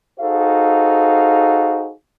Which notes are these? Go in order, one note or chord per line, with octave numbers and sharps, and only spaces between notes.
D#4 F#4 G#4 A4 C5 F5